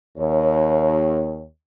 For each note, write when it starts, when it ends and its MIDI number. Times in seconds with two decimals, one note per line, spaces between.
0.18 1.46 39
0.18 1.46 73